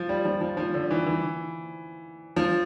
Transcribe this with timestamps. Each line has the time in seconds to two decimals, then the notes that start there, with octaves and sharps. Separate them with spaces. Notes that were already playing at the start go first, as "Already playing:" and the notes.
Already playing: F3
0.09 G3
0.25 F3
0.41 F3
0.57 F3
0.74 D3
0.91 E3
1.06 E3
2.36 F3